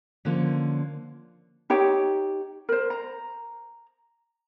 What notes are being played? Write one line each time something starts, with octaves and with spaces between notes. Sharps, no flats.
D3 F3 A#3 C#4
D#4 G4 C#5 G5
A#4 C5
A#5